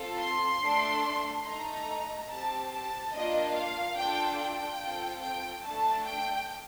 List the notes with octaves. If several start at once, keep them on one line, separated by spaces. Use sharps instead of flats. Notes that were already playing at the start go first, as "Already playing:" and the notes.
Already playing: C4 F4 A4
C6
A3 D4 A4
A3 D#4 A4 A#5
C4 G4 A5
A5
A#3 D4 F4 D#5
F5
D4 F4 A4 G5
G5
C4 F4 A4
G5
A3 D4 A4 A5
G5